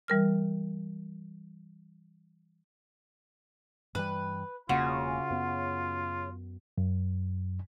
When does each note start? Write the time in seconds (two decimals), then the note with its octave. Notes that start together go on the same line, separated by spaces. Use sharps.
0.08 E3 G3 A#4 F6
3.95 G2 E3 G3 B4
4.69 E1 C#3 A#3 F4 F#4
5.30 F#2 B3
6.78 F#2